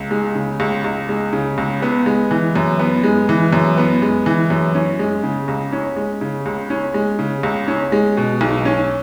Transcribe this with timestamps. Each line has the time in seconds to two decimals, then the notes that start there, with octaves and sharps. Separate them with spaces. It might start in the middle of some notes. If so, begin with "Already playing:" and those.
Already playing: C#2
0.11 G#3
0.35 C#3
0.60 C#2
0.84 C#2
1.09 G#3
1.33 C#3
1.58 C#2
1.82 B3
2.06 G#3
2.31 E3
2.56 F#2
2.79 B3
3.04 G#3
3.29 E3
3.53 F#2
3.78 B3
4.02 G#3
4.26 E3
4.50 F#2
4.75 C#4
4.99 G#3
5.23 C#3
5.48 C#2
5.73 C#4
5.96 G#3
6.21 C#3
6.46 C#2
6.70 C#4
6.94 G#3
7.19 C#3
7.43 C#2
7.68 C#4
7.92 G#3
8.17 B2
8.41 B1
8.65 C#4